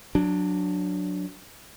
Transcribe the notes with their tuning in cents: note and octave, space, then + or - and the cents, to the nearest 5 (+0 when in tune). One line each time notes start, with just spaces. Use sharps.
F#3 -15 D4 +0